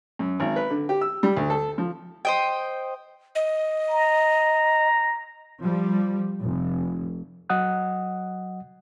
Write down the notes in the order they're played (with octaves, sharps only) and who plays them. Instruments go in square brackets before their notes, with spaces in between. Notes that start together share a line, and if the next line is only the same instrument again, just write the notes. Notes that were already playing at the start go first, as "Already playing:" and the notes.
[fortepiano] F#2
G#1
B4
D3
G4
E6
G3
D2
A4
F3
[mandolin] C5 D#5 G5
[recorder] D#5
[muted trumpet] A#5
[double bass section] F3 G3
F1
[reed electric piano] F#3 D#5 F#5 D#6 F#6